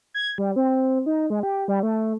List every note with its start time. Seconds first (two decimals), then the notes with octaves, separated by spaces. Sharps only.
0.14 G#6
0.38 G3
0.56 C4
1.06 D#4
1.30 G#3
1.43 G4
1.68 G3
1.83 A3